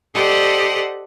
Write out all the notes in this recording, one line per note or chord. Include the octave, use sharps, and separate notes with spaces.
G4 A4 C5 D5 D#5 F#5